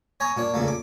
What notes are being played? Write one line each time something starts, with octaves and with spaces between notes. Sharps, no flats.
C#5 G#5 A#5 C#6 D#6
A#2 D4 C#5
A#2 C#3 A3 A#3
D6